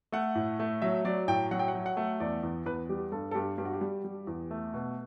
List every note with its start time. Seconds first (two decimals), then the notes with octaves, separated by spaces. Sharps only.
0.12 A3 F#5
0.35 A2
0.60 A3
0.82 F#3 E5
1.05 F#3 D5
1.28 A2 G5
1.51 F#3 F#5
1.59 G5
1.68 F#5
1.74 F#3
1.86 F#5
1.97 A3
2.20 E2 D5
2.43 E2
2.66 E2 B4
2.89 G3 G4
3.12 G2 A4
3.31 A4
3.35 G2 G4
3.58 G2 G4
3.65 F#4
3.73 G4
3.81 G3
4.04 G3
4.27 E2
4.51 A3
4.74 B2